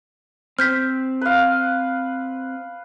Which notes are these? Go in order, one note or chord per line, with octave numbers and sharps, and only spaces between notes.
C4 F6 G6 B6
B4 F5